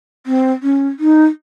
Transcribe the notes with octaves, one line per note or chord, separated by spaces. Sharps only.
C4
C#4
D#4